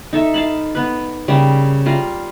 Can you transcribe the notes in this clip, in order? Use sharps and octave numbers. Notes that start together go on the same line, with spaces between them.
D#4 A4 E5
F5 A5 B5
B3 B4
C#3 G3 A#3
G3 F4 F5 A#5